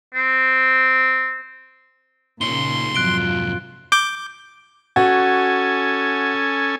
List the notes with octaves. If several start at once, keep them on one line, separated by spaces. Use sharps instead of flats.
C4
A#2 C#3 D#4 C#5 C6 G7
F2 G#2 C3 F#3 F4 F#6 D7 G7
D6 G6
C#4 F#4 A4 G#5